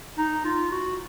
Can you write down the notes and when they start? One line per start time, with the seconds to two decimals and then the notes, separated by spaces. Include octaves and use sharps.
0.18 D#4
0.45 F4
0.71 F#4